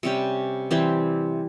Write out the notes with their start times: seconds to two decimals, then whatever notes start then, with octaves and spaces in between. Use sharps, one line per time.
0.03 C3 G3 C#4 G4
0.71 E3 G3 C4 G4